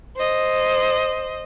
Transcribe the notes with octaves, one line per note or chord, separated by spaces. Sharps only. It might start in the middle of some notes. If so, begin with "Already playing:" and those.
C5 D#5